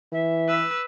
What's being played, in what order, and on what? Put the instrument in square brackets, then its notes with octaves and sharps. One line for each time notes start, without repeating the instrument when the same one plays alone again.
[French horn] E3 [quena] E5
[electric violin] B4 E6